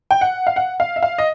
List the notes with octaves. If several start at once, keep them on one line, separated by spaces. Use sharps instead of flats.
G5
F#5
F5
F#5
F5
E5
F5
D#5